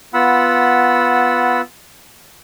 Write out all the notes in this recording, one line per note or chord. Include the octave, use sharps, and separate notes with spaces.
B3 F4 F#5 B5 E6